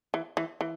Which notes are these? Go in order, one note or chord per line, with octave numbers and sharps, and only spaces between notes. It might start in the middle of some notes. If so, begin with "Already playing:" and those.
E3
E3
E3